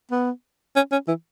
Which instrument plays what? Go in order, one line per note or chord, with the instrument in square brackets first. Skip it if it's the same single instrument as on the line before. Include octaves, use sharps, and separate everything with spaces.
[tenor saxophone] B3
C#4
C#4
E3